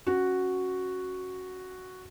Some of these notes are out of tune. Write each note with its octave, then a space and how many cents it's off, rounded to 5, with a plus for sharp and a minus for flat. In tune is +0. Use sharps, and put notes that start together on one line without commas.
C#4 -10 F#4 +0